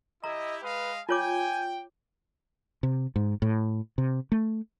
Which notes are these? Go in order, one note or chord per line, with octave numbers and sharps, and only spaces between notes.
E4 G4 D#5 A#5
G#3 B4 D#5 F5
F4 C#5 G5 G#5 D6
C3
G#2
A2
C3
A3